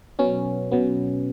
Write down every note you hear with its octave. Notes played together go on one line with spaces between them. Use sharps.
B2 F#3 B3 C#4
B2 F#3 B3